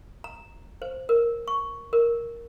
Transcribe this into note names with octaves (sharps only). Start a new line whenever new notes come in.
A#5
C5
A#4
C#6
A#4